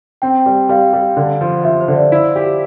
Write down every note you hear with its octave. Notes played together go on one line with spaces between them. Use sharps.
C4 G5
G3
G3 F5
G3
D3
F3
F3 E5
C5
D3
D5
E4
G4